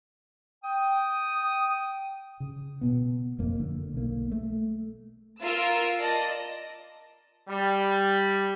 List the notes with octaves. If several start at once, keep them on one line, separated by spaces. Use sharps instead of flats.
G5 D#6
C#3
B2 B3
F#1 F2 A#3
D3
B1 A#3
A3
F4 A#4 E6
D5 D#5 A5 A#6
G3